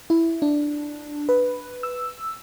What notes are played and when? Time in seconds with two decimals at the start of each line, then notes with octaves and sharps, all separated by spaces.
0.10 E4
0.42 D4
1.29 B4
1.83 E6